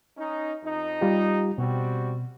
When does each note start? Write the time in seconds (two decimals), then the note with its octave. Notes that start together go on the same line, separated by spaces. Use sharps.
0.18 C#4 D#4
0.64 F2 D#4
1.01 G3 F4 G4
1.58 B2 G3 C4 F#4